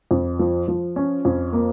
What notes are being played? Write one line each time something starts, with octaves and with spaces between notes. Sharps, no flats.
F2
F3
F3
C#4
F2
A#3